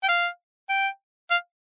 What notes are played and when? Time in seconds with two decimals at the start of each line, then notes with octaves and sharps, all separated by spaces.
0.03 G5
0.09 F5
0.69 G5
1.30 F5